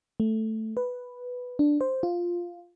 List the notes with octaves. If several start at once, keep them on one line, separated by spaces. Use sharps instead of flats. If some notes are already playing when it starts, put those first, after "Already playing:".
A3
B4
D4
C5
F4